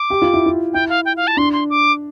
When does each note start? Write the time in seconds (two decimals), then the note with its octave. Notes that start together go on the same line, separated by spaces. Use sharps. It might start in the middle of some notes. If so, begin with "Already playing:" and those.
Already playing: D6
0.10 G4
0.22 F4
0.33 E4
0.46 F4
0.73 E4 G5
0.89 F5
1.05 G5
1.17 F5
1.27 A5
1.37 D4 C6
1.53 C6
1.70 D6